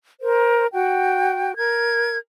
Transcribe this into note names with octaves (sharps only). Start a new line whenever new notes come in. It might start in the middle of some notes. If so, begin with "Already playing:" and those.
A#4 C5
F#4 G5
A#4 G#6